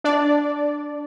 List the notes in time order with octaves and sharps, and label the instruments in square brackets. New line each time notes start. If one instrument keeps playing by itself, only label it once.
[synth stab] D4 D5